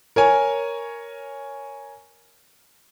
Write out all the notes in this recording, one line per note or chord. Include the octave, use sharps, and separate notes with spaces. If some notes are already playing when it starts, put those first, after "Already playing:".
A#4 C#5 G#5